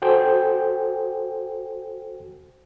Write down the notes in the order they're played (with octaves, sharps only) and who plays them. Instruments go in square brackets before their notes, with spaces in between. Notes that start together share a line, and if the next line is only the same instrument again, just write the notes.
[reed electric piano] F#4 A4 C5 G5 G#5